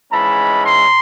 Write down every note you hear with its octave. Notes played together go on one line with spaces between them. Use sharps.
G#2 E3 G#3 C#4 A5 B5
A#5 C6